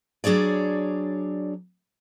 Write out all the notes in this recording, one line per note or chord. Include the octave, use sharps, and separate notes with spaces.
F#3 D4 G#4 C#5 D5